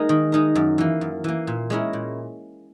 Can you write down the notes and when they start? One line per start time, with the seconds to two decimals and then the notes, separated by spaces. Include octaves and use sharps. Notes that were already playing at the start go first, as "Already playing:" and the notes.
Already playing: G#3 A#3 D#4 A#4
0.09 D#3
0.32 G#3 D#4 A#4
0.55 F#2
0.78 E3 A#3
1.01 F#2
1.24 E3 A#3
1.47 A#2
1.70 G#3 C#4 E4 A#4
1.93 A#2